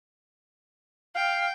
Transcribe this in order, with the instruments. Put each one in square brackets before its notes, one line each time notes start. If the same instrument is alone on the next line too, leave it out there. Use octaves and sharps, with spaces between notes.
[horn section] F5 [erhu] G5